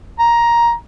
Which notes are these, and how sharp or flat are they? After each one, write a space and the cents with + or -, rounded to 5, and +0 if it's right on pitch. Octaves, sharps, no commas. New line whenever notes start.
A#5 +10